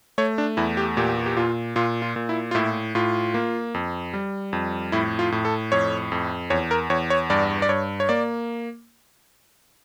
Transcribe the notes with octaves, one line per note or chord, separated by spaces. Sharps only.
A3 C#5
D4
E2 E4
G4
A#2 G4
G4
A#2 F4
A#2 F4
F4
A#2
E4
F4
A2 E4
A2 F4
A#3
F2
G3
F2
A2 E4
F4
A2
A4
F2 C#5
F2
E2 C#5
A#4
E2 C#5
C#5
G2 D5
D5
G2 C#5
C#5
A#3 D5